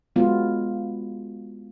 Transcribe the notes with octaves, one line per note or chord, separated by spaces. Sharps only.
F#3 G#3 B3 F4